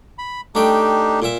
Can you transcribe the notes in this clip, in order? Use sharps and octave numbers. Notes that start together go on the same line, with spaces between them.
B5
A3 D4 D#4 G4 G5
A#2 E5